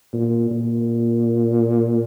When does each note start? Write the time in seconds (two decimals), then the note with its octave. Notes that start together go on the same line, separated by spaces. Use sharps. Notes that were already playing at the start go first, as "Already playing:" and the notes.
0.13 A#2
0.51 A#2